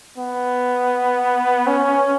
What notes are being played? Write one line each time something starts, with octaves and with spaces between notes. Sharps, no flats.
B3
C#4